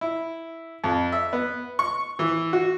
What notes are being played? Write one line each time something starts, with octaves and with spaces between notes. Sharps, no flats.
E4
F2
E5
B3
C#6
E3
F#4